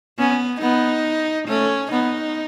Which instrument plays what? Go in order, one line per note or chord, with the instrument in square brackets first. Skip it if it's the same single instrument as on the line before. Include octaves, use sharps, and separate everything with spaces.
[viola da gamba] B3 [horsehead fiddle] C#4
[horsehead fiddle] B3 [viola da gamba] D#4
[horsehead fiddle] A3 [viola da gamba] C#4
[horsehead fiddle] B3 [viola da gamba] D#4